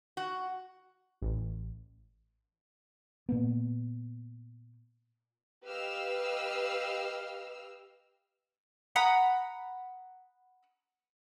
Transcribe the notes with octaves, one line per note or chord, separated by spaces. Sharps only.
F#4
A1
A#2 A#3 B3
G4 B4 D#5 F5 E6 F6
F#5 A#5 B5 D#6